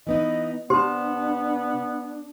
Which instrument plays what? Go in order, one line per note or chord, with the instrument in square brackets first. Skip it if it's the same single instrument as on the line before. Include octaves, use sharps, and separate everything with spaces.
[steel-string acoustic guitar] E3 B3 D#4 [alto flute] D#5
[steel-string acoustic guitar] C3 A5 [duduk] B3 [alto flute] D4 [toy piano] G4 C5 C6